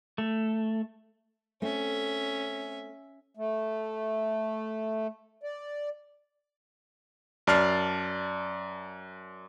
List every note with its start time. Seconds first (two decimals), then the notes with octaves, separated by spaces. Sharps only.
0.18 A3
1.62 A3 C4 C#4 E5
3.37 A3
5.43 D5
7.47 F#2 D5 A5 F6 A6 C7